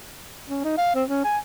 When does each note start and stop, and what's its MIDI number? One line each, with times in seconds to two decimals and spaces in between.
0.49 0.62 61
0.64 0.75 63
0.78 0.94 77
0.95 1.04 60
1.08 1.24 61
1.25 1.38 80